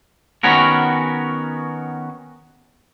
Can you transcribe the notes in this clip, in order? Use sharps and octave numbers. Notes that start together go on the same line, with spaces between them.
D#3 B3 C#4 F#4 A#4